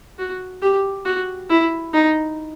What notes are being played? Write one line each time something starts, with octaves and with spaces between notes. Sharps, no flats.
F#4
G4
F#4
E4
D#4